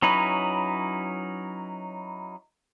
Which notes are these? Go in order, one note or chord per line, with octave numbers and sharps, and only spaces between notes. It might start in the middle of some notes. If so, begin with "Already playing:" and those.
F#3 C#4 D#4 E4 B4